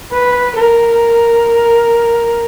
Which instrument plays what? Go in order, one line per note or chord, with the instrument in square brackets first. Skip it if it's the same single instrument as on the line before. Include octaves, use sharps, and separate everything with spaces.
[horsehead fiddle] B4
A#4